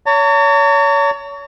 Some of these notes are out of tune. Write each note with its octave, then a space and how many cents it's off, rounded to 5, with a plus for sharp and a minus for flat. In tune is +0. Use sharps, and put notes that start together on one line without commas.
C#5 +30 A#5 -45